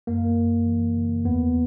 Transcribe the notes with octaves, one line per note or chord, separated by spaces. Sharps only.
F#2 A#3
F#2
E3
C#3
E2 B3